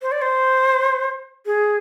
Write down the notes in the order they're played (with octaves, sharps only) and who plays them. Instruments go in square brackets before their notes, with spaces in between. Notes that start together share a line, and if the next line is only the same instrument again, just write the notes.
[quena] C5
D5
C5
G#4